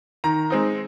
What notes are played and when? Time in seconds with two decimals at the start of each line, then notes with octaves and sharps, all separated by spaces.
0.24 D#3 A#5
0.50 G#3 C4 D#4